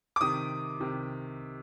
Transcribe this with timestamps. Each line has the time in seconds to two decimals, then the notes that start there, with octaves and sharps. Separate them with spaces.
0.16 D6
0.21 C3 D#3 D#6
0.80 C3 D#3